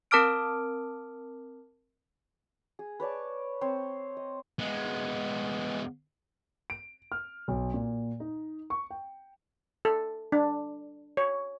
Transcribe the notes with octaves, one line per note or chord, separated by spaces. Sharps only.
C4 A#4 A5 D6 F6 D7
G#4
B4 C#5 D5 A5
C4 C5 C#5
D#5
G#3 B3
D7
F6
B1
A#2
D#4
C#6
G5
A4
D4
C#5